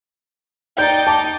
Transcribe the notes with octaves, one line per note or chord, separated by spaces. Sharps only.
D#4 D5 G5 G6 A6
A5 D6